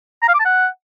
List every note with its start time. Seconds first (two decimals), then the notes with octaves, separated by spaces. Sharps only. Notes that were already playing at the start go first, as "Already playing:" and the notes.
0.22 A#5
0.28 F5
0.34 D6
0.39 A5
0.45 F#5